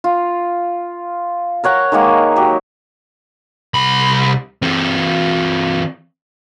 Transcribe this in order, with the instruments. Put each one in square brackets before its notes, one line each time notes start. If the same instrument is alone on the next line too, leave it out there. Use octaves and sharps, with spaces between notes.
[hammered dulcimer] F4
A#4 C#5 F#5 A#5
D#3 G#3 A#3 F#5
F#3 G4
[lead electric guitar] C2 B5
E3 C4